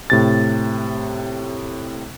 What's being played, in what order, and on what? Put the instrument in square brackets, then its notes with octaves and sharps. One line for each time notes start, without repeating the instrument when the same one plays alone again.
[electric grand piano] A2 C3 A6